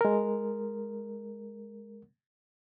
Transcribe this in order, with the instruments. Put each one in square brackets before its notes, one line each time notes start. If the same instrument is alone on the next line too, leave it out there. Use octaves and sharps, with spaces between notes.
[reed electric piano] G#3 A#4